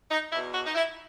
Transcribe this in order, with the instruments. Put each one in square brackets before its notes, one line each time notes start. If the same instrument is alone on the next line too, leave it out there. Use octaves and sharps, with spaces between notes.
[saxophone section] D#4
E2 B2 E4
F#4
D#4
E4